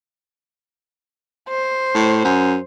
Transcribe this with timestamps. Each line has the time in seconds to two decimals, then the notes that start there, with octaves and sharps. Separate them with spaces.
1.49 C5
1.95 A2
2.25 F#2